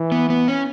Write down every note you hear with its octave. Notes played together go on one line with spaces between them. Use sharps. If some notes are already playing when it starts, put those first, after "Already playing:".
Already playing: E3
B3
B3
C#4